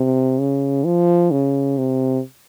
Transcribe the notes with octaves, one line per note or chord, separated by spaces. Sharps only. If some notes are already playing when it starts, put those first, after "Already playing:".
Already playing: C3
C#3
F3
C#3
C3